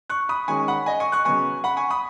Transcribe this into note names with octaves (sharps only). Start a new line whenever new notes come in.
C#6 F#6
B5 D#6
D#3 G#3 C#4 G#5 C#6
F#5 B5
D#5 G#5
G#5 C#6
C#6 F#6
C#3 F#3 B3 G#5 C#6
F#5 B5
G#5 C#6
B5 D#6